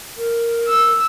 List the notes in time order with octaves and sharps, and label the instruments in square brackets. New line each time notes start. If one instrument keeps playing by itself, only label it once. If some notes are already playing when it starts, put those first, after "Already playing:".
[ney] A#4
[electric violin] E6